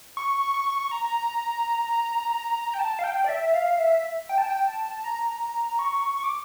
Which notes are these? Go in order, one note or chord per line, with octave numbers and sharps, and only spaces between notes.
C#6
C#6
A#5
G5
A5
F5
G5
D5
E5
F5
E5
G5
A5
G5
A5
A#5
C#6
C#6
D6